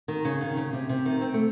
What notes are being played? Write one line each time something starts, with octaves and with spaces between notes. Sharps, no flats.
D#3
C#3
D#3
C#3
C3
C3
D#3
C4
A3